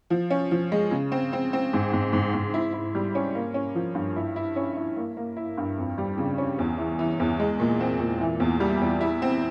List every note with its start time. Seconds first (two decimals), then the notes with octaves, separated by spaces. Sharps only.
0.10 F3
0.30 C#4
0.51 F3
0.72 G#3
0.91 C#3
1.12 C4
1.33 C4
1.53 C4
1.73 G#2
1.93 G#2
2.13 G#2
2.34 G#2
2.54 E4
2.73 E4
2.95 G3
3.15 C#4
3.35 A#3
3.54 C#4
3.75 F3
3.95 G2
4.16 E4
4.36 E4
4.56 C#4
4.76 E4
4.97 A#3
5.17 A#3
5.36 E4
5.57 G2
5.78 F2
5.98 G3
6.18 C#3
6.38 C#4
6.59 E2
6.78 E3
6.99 E3
7.20 E2
7.40 G#3
7.60 A#2
7.80 C4
8.00 A#2
8.21 E3
8.40 E2
8.60 G3
8.81 E2
9.01 E4
9.22 C4